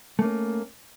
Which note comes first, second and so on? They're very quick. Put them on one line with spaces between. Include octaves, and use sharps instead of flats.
A3 A#3 C#4